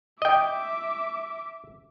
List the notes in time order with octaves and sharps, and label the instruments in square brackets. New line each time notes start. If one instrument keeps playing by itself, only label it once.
[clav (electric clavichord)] D#5 G5 [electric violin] E5 D6